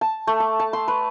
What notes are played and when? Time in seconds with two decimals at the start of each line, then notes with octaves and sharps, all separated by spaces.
0.01 A5
0.27 A3
0.40 D6
0.60 A5
0.73 C6
0.88 B4